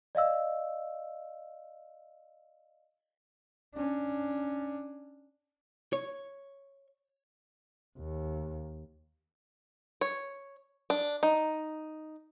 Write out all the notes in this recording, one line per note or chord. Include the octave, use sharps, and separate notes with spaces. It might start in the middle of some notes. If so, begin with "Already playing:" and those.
D5 D#5 F5 E6
C#4 D4
C#5
D#2
C#5
D4
D#4